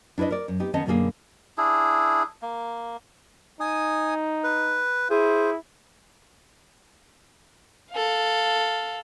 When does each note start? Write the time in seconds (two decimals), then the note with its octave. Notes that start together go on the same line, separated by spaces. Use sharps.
0.18 D4 E4 B4 D5 D#5
0.31 A#4 D5
0.48 F#2
0.60 B3 D#4 G4
0.74 D#3 B3 C#4 D#5 A5
0.86 F#2 B2 D3 G3 A#3 G#4
1.58 D4 E4 G#4
2.42 A#3
3.60 D#4 G#5 D#6
4.44 B4
5.10 E4 G#4 C5
7.92 A4 F5